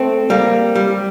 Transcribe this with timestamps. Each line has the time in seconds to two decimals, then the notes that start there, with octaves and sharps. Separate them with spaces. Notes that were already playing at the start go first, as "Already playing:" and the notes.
Already playing: A3 C4
0.30 G3 A#3
0.76 G3